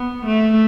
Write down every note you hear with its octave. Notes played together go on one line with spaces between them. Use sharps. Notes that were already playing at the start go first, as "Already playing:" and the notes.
Already playing: B3
A3